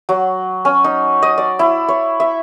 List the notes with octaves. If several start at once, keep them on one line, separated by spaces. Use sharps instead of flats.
F#3
C#4
D#4
D#5
D5
E4
C#5
E5